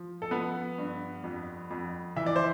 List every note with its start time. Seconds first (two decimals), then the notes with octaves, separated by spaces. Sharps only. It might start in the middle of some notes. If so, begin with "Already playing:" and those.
Already playing: F3
0.22 A4
0.31 F3 B3 B4
0.78 G2
1.24 F2
1.70 F2
2.16 E3 E5
2.26 D5
2.36 C5